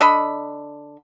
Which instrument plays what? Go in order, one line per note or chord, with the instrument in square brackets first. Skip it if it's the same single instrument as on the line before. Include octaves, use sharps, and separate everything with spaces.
[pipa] D3 D#5 B5